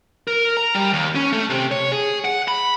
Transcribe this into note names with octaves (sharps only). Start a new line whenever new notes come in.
A#4
A#5
G3
D#2
C#4
A3
C3
C#5
G#4
F#5
B5